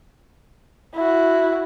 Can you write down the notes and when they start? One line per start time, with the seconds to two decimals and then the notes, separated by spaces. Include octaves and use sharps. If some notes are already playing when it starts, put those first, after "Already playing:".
0.94 E4 F#4